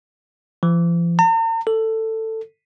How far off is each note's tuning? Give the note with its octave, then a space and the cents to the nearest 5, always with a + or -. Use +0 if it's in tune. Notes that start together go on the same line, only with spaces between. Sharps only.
F3 -45
A#5 -45
A4 +15